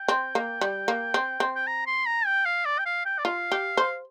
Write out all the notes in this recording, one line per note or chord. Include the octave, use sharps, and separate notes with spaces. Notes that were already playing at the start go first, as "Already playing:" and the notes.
Already playing: G5
C4
A#3
G3
A#3
C4
C4
G5
A#5
C6
A#5
G5
F5
D5
G5
F5
G5
D5
F4 F5
G4
C5